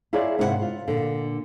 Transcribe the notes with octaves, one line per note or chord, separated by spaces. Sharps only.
E4 F4 G#4 A#4 C#5 D5
G#2 C3 A#3 E4 A#4 F#5
F4
A#2 D3